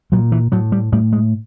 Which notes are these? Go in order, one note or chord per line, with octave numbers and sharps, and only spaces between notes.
A#2 F#3
E3
A2 F#3
G3
A2 G3
G#3